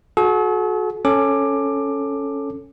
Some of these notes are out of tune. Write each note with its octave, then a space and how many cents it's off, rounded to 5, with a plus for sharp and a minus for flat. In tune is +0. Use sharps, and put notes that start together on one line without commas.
F#4 -15 A4 -45
C#4 -5 A4 +0 D6 +15